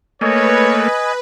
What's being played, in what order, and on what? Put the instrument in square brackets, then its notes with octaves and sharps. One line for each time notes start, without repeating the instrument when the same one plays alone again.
[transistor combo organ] A3 A#3 [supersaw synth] B4 [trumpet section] C#5 [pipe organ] D#5 G#5